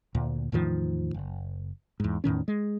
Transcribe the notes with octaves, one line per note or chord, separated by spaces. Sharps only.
D2 A#2
E2 A2 D#3 F3
F#1
E2 G#2
E2 A2 D#3 C#4
G#3